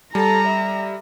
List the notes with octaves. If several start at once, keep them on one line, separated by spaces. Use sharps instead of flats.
G3 A4 A#5
E5